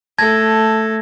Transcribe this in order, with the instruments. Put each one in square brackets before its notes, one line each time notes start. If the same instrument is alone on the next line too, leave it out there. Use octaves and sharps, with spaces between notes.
[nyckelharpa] A3 A4 [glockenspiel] A5 G#6 A#6